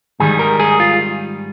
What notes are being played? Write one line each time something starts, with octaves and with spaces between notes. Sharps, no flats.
G#2 D#3 G3 G#4
A#4
G#4
F4